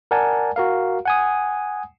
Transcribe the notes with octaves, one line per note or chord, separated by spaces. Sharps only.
A#4 D5 F#5 G#5 A5
F#4 A#4 F5
F#5 G#5 D#6